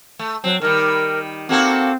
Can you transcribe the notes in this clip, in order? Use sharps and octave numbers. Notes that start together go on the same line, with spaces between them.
A3
F#3 C4
D#3 G3 A#4
A#3 C4 F#4 A4